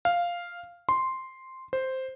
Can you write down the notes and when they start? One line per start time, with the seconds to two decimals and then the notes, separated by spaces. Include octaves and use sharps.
0.05 F5
0.89 C6
1.73 C5